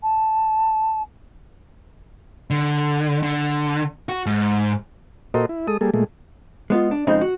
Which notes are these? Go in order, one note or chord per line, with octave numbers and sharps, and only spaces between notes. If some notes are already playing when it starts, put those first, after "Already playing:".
A5
D3
D3
F#4
G#2
A#2 F#4 A4 A#4 C5 D#5
E4
G#3 A4 D#6
G3 A#3 G#4 A4
A#2 G#3 A3
G#3 B3 F4
D4
F2 C#3 G#3 C4 D#4
F#4